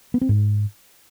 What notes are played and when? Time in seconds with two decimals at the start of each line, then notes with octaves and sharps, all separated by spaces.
0.14 B3
0.21 C4
0.29 G#2